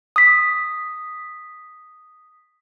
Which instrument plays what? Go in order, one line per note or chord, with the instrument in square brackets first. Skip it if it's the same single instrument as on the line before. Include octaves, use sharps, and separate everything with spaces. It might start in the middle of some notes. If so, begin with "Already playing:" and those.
[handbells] D#6 B6